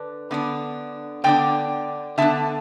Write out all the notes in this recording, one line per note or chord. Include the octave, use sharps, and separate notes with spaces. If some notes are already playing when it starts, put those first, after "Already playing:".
Already playing: D3 D4 B4
D3 B3 D4
D3 B3 D4 D5 G5
D3 B3 D4 E5 A5